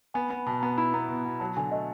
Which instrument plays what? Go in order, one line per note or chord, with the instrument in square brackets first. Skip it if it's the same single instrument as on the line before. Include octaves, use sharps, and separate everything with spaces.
[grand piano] B3 [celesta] G#5
[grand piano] B3
[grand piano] B2 [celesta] A5
[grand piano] B3 [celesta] A#5
[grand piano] E4 [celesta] B5
[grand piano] B3 [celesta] A#5
[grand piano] B2
B2
[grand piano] F#3 [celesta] A5
[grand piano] D3 [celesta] G#5
[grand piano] A3 [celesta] D#5